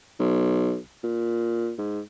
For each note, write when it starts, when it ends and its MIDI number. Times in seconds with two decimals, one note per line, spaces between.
0.20 0.77 35
1.03 1.73 46
1.78 2.01 44